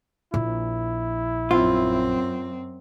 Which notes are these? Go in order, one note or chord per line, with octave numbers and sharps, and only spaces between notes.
A#1 E4
F#2 C4 F4